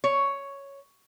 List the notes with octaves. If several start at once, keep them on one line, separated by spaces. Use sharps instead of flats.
C#5